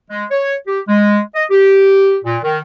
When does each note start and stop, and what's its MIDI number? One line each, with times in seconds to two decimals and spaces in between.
0.10 0.25 56
0.31 0.54 73
0.67 0.81 67
0.88 1.19 56
1.35 1.45 75
1.51 2.17 67
2.25 2.37 46
2.43 2.59 51